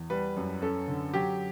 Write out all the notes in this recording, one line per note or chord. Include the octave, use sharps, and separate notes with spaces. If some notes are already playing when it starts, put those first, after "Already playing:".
Already playing: E2
G3 B4
F#2
C#4 A4
D3
F#3 G4